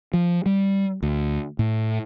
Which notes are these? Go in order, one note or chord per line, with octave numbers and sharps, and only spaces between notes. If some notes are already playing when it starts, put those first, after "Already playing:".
F3
G3
D2
A2